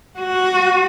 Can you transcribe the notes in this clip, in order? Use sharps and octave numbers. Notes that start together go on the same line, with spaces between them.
F#4